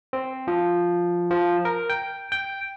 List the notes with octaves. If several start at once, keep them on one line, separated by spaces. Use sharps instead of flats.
C4
F3
F3
A#4
G5
G5